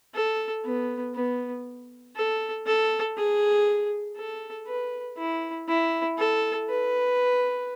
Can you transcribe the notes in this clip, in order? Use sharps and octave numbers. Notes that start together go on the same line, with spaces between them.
A4
B3
B3
A4
A4
G#4
A4
B4
E4
E4
A4
B4